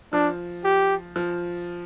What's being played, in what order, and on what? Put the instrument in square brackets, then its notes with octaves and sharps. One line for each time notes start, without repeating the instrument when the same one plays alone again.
[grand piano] F3 [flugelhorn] D4
[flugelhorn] G4
[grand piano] F3